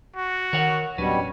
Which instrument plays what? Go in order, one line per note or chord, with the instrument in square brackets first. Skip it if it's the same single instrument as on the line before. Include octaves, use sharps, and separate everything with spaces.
[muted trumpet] F#4
[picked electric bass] D#3 [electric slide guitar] A#4 C#5 F#5
[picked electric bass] D1 F#3 D4 [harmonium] B2 G3 [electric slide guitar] C#4 B4 [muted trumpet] C#5